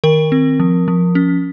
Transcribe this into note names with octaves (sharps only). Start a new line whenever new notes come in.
D#3 A#4
C4
F3
F3
C#4